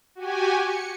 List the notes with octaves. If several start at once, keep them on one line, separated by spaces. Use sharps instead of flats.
F#4 G4 G#5
C#7